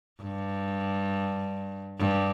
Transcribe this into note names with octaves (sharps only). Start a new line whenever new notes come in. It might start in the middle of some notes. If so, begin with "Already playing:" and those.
G2
G2